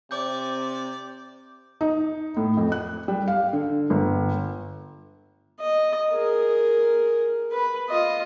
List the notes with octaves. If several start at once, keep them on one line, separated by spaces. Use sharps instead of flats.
C3 C4 D5 D6 G6
D#4
A2
F2
F#6
G3
F5
D3
G1
D#5
G#4 A#4
B4
F4 D#5